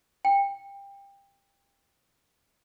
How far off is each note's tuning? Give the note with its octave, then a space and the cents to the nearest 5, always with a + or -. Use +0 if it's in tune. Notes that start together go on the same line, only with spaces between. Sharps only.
G5 +20